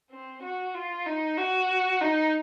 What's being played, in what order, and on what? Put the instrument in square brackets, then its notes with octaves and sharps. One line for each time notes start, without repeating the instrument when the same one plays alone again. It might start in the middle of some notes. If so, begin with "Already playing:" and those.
[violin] C4
F#4
F4
D#4
F#4
D#4